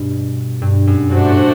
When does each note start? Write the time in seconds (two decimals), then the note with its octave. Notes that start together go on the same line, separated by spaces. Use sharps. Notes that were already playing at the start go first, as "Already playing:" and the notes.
Already playing: G2 B2
0.62 G2
0.87 F#2
1.11 G2 A3 D4 F#4 C5
1.28 A2